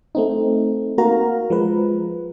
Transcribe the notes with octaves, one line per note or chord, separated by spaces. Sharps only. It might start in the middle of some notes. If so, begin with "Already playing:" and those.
A3 C4 D#4
A#3 F#4 A#4 F5 A#5
F3 G#3 B4